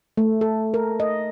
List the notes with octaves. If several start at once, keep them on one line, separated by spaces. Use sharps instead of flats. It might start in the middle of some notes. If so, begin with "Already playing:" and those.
A3
A4
A#4
D#5